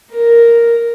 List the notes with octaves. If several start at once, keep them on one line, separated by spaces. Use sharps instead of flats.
A#4